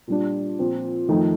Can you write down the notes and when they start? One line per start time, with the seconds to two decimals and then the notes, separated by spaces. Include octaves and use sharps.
0.07 A#2 G3 D4
0.59 A#2 F3 C4
1.09 F2 D#3 A3 D#4